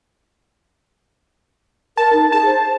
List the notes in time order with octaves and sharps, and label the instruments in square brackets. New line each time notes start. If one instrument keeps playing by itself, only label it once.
[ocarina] A#4 [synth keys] A5
[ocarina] D#4
[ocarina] G#4 [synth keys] A5
[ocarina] C5